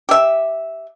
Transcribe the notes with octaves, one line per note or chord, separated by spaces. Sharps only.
G4 E5